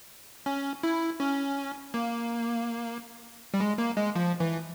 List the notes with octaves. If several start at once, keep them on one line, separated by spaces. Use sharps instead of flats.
C#4
E4
C#4
A#3
G3
G#3
A#3
G#3
F3
E3